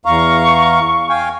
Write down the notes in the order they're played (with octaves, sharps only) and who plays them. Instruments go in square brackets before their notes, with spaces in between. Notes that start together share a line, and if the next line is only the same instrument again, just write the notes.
[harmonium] E2 F5 A#5 [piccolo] C#6
[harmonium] F5 G5 G#5